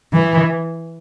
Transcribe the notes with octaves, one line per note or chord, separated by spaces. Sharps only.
E3